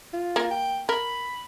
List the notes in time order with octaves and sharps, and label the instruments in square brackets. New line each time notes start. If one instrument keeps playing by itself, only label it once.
[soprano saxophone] F4
[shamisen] A#3 A#4
[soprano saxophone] G5
[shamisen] A#4 [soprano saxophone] B5